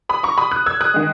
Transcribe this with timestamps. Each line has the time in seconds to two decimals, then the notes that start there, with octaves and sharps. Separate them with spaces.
0.09 B5 D#6
0.23 A#5 C#6
0.38 B5 D#6
0.51 D#6 F#6
0.66 E6 G#6
0.81 D#6 F#6
0.94 D#3 G#3